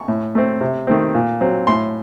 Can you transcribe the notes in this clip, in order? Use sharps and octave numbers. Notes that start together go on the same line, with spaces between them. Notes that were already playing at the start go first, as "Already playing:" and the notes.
Already playing: C#6
A2
A3 C4
C3
D#3 A3 C4
A#2
F#3 C4
A2 C6